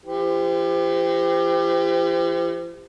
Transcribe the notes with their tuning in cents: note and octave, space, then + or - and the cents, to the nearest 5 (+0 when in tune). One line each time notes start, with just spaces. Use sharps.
F3 -45 G4 +20 C5 -30